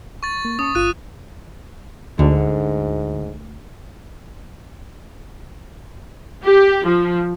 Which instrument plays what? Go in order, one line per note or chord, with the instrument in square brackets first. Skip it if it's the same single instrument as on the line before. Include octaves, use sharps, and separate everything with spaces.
[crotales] C#6 A6
[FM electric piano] A#3
[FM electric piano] C#4 A5 C#6 [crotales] D#6
[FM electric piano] G1 F4 [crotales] F#6 D#7
[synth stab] D2 [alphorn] G#2 [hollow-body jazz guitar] D3
[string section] G4
F3